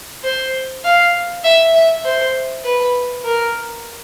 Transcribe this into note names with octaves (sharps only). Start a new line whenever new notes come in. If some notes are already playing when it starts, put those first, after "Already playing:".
C5
F5
E5
E5
C5
B4
A#4